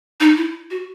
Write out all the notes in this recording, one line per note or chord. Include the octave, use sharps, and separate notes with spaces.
D#4
E4
F#4